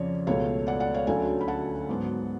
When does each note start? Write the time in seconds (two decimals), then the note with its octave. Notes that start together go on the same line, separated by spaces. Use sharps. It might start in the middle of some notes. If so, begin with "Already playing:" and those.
Already playing: F2 C#3 F3 C#5 D5
0.27 C#2 B2 A3 C#5 F5
0.67 D5 F#5
0.80 D5 F#5
0.94 C#5 F5
1.07 D2 D3 F#3 A3 C#4 F5 G#5
1.41 B5
1.48 F#5 A5
1.89 G#2 F#3 B3